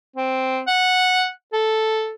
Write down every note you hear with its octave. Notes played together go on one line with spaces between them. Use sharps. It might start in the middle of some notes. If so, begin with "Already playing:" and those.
C4
F#5
A4